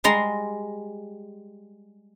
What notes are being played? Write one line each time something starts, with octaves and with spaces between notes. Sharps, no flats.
G3 G#3 A#5 C6